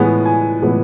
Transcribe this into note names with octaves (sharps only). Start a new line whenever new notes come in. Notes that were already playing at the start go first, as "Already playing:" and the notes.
Already playing: A2 E3 G#3 B3 G#5
G#5
A2 E3 G#3 B3